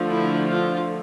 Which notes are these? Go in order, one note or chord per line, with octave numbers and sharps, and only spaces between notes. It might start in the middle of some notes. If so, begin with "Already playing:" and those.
Already playing: D3 F3 A3
E4
F4